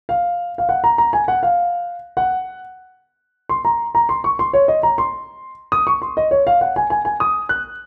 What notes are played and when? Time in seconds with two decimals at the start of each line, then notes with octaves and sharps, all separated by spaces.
0.09 F5
0.58 F5
0.69 F#5
0.84 A#5
0.98 A#5
1.13 G#5
1.28 F#5
1.43 F5
2.17 F#5
3.49 C6
3.65 A#5
3.95 A#5
4.09 C6
4.24 C#6
4.39 C6
4.53 C#5
4.68 D#5
4.83 A#5
4.98 C6
5.72 D#6
5.87 C#6
6.02 C6
6.17 D#5
6.31 C#5
6.47 F5
6.61 F#5
6.76 G#5
6.90 G#5
7.05 G#5
7.20 D#6
7.49 F#6